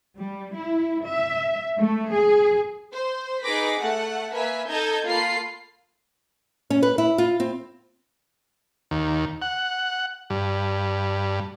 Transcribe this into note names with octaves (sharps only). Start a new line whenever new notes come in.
G3
E4
E5
A3
G#4
C5
D#4 G#4 B4 D6 A#6 B6
A3 F#5
A#3 B4 E5 G#5
D#4 A4 D#5 A5 G6 G#6
A#3 F4 A4 B5 C7
C#4
B4
E4
F4
C4
D#2
F#5
G2